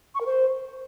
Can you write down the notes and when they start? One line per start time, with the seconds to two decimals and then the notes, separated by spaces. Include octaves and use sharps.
0.15 C#6
0.20 A#4
0.26 C5